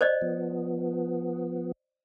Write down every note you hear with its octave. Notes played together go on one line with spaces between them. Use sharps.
C5 D5 D#5
F3 B3